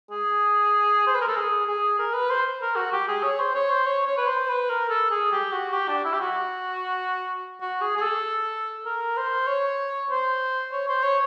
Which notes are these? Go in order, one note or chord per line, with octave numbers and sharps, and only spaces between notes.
G#4
C5
B4
A#4
A4
G#4
G#4
A#4
B4
C5
A#4
F#4
G4
G#4
C#5
C5
C#5
C5
C#5
C#5
B4
C5
B4
A#4
A4
G#4
G4
F#4
G4
D4
E4
G4
F#4
F#4
G#4
G#4
A4
A#4
C5
C#5
C5
C#5
C5
C#5